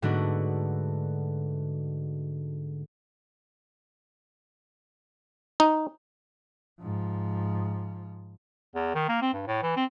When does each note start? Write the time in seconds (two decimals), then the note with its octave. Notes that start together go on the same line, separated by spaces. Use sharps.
0.02 G#2 D3 A3 B3 D4 F#4
5.60 D#4
6.81 G#2 F3
8.75 E2
8.95 D#3
9.09 A#3
9.22 C4
9.34 G2
9.47 A2
9.62 E3
9.77 C4